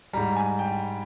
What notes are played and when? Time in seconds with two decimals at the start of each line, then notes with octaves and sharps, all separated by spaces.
0.13 G#2 G3 A#5
0.36 G#5
0.59 G5